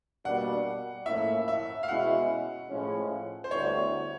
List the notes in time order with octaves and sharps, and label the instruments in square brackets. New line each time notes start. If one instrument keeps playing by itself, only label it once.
[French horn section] B2 G3 A#3 D4 [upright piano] F#5
[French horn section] A2 F3 A#3 C#4 E4 [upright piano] E5
[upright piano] E5
F5
[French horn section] B2 G#3 C#4 E4 [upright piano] F#5
[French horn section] A2 F3 G#3 C#4
[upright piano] C5
[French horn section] D2 D3 G3 B3 E4 [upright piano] C#5